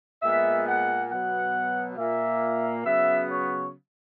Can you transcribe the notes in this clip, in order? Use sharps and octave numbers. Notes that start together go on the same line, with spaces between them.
A#2 G#3 B3 E5
F#5
B2 F#3 B3 F#5
A#2 A#3 E5
C#3 F#3 B3 E5
C#5